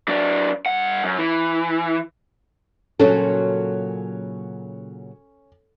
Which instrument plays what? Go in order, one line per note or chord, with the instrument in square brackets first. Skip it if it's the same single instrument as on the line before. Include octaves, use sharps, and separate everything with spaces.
[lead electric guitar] F#3 D4
G2 F#5
F#2
E3
[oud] A#2 C#3 F#3 [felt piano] C#4 C#5 [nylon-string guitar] A4